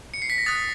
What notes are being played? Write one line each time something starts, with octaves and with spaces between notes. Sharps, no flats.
C#7
C7
B6
A#6
D#6 F#6 A6